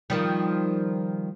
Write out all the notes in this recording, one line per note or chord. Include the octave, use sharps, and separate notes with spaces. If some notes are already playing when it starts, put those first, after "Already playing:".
D#3 F3 G3